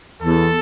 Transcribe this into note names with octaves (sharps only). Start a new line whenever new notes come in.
E2 A4